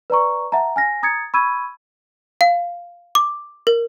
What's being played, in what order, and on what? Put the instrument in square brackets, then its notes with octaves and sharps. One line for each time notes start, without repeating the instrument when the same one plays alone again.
[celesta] B4 D5 A#5 C#6
E5 F#5 A5 A#5
G#5 F6 A#6
A#5 D#6 G#6 A6 C#7
B5 C#6 E6 G#6 D#7
[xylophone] F5
D6
A#4